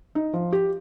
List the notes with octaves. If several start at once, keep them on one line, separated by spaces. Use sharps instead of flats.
D#4
F3
G4